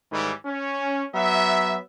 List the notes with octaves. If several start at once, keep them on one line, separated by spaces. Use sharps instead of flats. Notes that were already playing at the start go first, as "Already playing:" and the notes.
G#2 D#3 E3 G3
C#4
F#3 B3 E5